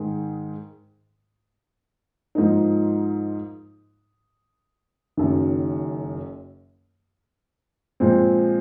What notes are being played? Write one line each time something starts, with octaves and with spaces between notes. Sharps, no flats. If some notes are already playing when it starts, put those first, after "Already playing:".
Already playing: G#2 D#3 G#3
G#2 F3 A#3 D#4
F#1 F#2 D#3
A#2 F3 G#3 C4